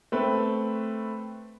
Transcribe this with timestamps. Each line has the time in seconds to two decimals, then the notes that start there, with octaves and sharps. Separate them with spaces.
0.12 A3 C4 B4